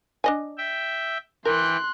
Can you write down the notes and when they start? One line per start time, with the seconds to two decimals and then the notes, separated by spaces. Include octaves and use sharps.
0.24 D4 D#5 G#5
0.58 E5 G5
1.45 E3 A#4 G5 C6 F#6